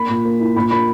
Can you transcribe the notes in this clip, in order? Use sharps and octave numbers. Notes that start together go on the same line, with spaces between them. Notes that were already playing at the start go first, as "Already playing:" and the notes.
Already playing: A#3 B5
A#2
A#3
E4
A#2 B5
A#3 B5